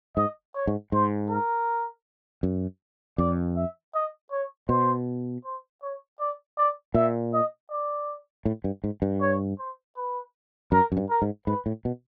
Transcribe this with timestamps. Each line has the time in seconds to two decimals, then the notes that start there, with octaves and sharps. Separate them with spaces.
0.17 G#2 D#5
0.55 C#5
0.67 G#2
0.92 G#2 C5
1.29 A#4
2.43 F#2
3.18 F2 D5
3.56 E5
3.94 D#5
4.31 C#5
4.69 B2 C5
5.44 C5
5.82 C#5
6.19 D5
6.57 D5
6.94 A#2 E5
7.33 D#5
7.70 D5
8.45 A2
8.64 G2
8.84 G#2
9.02 G2
9.21 C#5
9.59 C5
9.97 B4
10.72 F#2 A#4
10.92 F#2
10.97 G2
11.10 A#4
11.22 G#2
11.47 G#2 B4
11.66 A2
11.85 B2